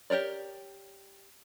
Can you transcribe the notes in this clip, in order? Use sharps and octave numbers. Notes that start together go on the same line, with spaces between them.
G4 A#4 C#5 D5